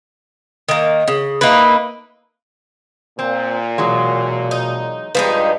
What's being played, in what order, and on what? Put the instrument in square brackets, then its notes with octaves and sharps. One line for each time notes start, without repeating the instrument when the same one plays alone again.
[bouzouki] D#3 A#3
C#3
A#3 D#4 E4 B4
[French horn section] A#2 [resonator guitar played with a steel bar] C4
[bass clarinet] B2 [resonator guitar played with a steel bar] E3 F#3 G#3
[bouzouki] D#4
[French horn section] G2 [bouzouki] F3 G#3 D#4 [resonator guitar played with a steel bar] B4